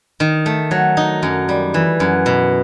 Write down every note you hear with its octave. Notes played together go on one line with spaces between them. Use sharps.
D#3
A3
F#3
D#4
F#2
G3
E3
F#2
B2